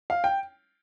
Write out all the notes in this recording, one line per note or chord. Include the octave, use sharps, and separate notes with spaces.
F5
G5